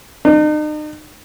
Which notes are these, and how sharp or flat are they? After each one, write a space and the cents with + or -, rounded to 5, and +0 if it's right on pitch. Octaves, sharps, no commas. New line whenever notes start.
D#4 -40